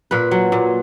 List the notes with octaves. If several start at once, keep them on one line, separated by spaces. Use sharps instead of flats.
A#2 B4
F#3
A#2